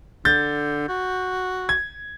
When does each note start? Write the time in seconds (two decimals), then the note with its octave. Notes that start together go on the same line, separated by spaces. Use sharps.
0.25 D3 G6 A6
0.89 F#4
1.69 G#6